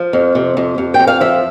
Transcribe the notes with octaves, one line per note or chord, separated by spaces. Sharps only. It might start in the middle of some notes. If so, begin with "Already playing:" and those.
Already playing: F3
F2
C3
F2
F2
G5
F2
F5
F3 E5